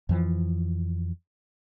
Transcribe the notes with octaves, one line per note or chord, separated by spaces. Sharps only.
F2 E3 F3